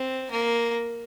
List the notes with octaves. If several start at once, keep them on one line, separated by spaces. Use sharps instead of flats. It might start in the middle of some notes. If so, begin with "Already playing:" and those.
Already playing: C4
A#3